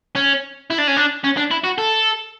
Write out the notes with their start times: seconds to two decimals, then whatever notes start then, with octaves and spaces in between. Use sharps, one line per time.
0.16 C#4
0.70 E4
0.78 D4
0.87 C#4
0.97 D4
1.24 C#4
1.37 D4
1.51 E4
1.64 F#4
1.78 A4